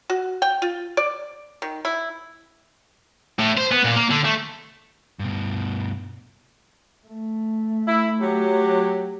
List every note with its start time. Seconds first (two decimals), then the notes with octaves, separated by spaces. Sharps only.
0.10 F#4
0.42 G5
0.62 F4
0.97 D5
1.62 D#3
1.85 E4
3.39 A2
3.57 C5
3.72 B3
3.84 A#2
3.96 A#3
4.10 D3
4.25 A3
5.19 G2 B2
7.07 A3
7.87 E4
8.21 F#3 G4